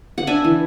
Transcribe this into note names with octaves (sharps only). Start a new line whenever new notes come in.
F#5
D4 E5 G#5
E3